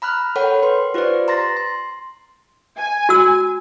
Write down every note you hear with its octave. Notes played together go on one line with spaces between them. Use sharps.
A#5 B5 F6 F#6
A4 A#4 C#5 F#5 G5 B5
B4 C6
F4 G4 B4 C5 D5
A#5 C6 A6 A#6
C6
G#5
F#4 E6